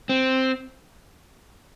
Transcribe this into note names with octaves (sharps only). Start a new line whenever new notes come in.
C4